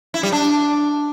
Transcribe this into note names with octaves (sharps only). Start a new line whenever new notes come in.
E4
G3
D4